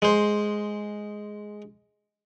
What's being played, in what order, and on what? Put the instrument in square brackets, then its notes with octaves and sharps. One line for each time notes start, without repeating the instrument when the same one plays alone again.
[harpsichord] G#3 C5